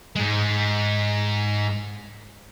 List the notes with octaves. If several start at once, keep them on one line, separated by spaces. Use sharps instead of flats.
G#2 G#3